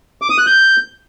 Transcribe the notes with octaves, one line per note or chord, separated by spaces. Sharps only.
D6
D#6
F#6
G6